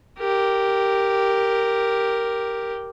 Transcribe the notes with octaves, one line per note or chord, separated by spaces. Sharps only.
G4 A#4